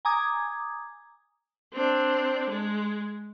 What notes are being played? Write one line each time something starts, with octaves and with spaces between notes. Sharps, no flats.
G#5 A#5 D6 D#6 G#6
C4 D4
G#3